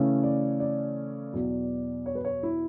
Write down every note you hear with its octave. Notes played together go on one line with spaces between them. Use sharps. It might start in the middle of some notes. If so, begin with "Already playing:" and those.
Already playing: C#3 E3 A3 C#4
D5
D5
E2 B2 F#3
C#5
B4
C#5
E4